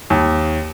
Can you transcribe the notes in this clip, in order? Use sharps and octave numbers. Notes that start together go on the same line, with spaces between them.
D#2